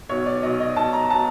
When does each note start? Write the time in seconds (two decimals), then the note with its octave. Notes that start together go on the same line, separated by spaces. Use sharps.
0.09 B1 B2 C#5
0.26 D5
0.43 B1 B2 D#5
0.60 D#5
0.76 B1 B2 A5
0.93 A#5
1.10 B2 A5